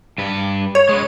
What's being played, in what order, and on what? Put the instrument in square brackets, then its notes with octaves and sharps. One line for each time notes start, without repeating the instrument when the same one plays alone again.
[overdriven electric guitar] G2 B4
[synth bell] C#5
[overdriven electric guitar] G#3 B4